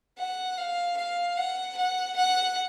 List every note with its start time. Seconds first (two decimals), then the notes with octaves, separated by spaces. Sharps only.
0.18 F#5
0.57 F5
0.97 F5
1.37 F#5
1.77 F#5
2.16 F#5